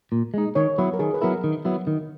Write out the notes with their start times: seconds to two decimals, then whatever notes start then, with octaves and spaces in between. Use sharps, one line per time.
0.12 A#2
0.34 G#3 D#4
0.55 D#3 C#5
0.78 F#3 B3 E4 B4
0.94 A#4
0.99 D#3 G#4
1.14 B4
1.21 F#3 B3 E4 A#4
1.44 D#3
1.65 F#3 B3 E4
1.87 D#3